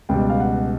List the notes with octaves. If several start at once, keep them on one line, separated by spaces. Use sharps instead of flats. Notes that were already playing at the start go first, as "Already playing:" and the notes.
C#2 B2 G3 G5
F5
F#5